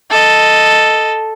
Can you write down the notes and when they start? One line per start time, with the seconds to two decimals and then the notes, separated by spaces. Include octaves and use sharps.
0.10 A4 D#5